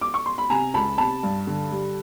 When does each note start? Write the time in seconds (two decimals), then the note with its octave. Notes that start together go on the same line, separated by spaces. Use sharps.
0.01 D6
0.14 C#6
0.26 C6
0.38 B5
0.50 C3 G#5 A#5
0.74 C#2 A5 B5
0.98 C3 A5 B5
1.23 G2
1.47 D3
1.71 G3